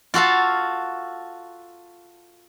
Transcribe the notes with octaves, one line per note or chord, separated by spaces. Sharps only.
F4 F#4 A4 F5